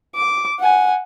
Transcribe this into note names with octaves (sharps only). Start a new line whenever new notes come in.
D6
F#5 G#5